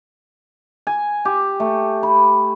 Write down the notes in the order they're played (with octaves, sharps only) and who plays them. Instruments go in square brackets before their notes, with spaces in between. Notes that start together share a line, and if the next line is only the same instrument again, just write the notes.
[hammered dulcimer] G#5
G4
A3
B5